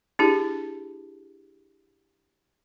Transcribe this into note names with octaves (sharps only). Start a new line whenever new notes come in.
D4 E4 G4 G#4